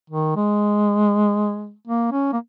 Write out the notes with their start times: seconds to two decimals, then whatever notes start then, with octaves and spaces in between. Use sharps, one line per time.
0.10 D#3
0.36 G#3
1.88 A#3
2.12 C#4
2.33 A#3